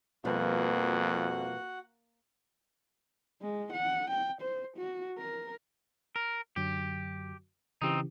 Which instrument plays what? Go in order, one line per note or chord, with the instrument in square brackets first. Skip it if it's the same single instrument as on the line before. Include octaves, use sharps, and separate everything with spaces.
[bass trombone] F2 [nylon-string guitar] B2 F3 G3 [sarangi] A#3 [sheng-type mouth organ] F#4 F#5
[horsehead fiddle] G#3
F#5
G5
C5
F#4
A#4
[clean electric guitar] A#4
[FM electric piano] F#2 D3 F#3 [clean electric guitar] G4
[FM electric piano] C#3 E3 G4 [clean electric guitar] C4 D#4